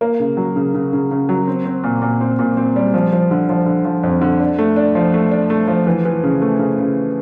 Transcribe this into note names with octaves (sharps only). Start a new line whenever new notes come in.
A#3
C#3
F#3
C#3
C#3
C#3
C#3
F#3
C4
C4
A#2
A#2
C4
A#2
C4
G3
F3
F3
D3
F3
D3
F3
F2
D3
D4
A3
D4
F3
A3
D4
A3
F3
E3
E3
C#3
A3
C#3
C#3